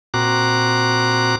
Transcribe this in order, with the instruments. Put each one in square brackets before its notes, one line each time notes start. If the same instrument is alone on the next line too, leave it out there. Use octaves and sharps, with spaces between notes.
[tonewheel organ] A#2 C4 F#4 A#5 D6 F#6